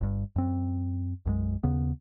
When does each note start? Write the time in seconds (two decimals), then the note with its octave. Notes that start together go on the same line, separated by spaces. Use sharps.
0.01 G1 G2
0.36 F#2 C4
1.25 B1 F#2 G#3
1.63 D#2 C#3 B3